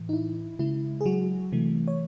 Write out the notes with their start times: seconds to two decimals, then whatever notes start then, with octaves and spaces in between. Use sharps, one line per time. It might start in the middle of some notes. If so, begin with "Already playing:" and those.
Already playing: A2 E3
0.09 D#4
0.13 E4
0.59 C#3 G#3 E4
1.01 G#4
1.06 F#3 F#4
1.52 C3 E3 A3
1.88 C#5